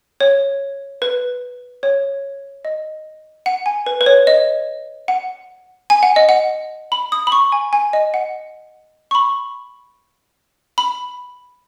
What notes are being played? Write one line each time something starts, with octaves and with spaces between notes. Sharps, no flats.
C#5
B4
C#5
D#5
F#5
G#5
B4
B4
C#5
D#5
F#5
G#5
F#5
D#5
F#5
B5
D#6
B5
C#6
G#5
G#5
D#5
F#5
C#6
B5
B5